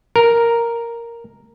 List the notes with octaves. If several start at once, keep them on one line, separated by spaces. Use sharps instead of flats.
A#4